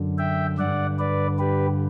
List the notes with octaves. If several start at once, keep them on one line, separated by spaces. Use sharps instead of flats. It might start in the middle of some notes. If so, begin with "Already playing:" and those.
Already playing: F#2 D3
E5 G5
G2 D3 D5 F#5
B4 D5
G4 B4